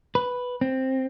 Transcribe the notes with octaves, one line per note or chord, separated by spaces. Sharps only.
B4
C4